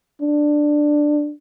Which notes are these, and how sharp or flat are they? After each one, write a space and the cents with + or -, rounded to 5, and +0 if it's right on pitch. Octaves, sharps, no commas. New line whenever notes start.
D4 +10